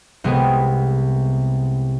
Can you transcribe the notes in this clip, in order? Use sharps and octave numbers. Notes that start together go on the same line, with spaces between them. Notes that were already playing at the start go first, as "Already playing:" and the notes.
C2 C3 G#3 B3